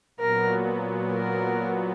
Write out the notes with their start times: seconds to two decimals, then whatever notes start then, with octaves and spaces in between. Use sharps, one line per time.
0.20 A#2 F#3 B3 A#4
1.11 A#4